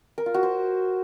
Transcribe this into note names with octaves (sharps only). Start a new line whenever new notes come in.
A#4
F4
F#4
C5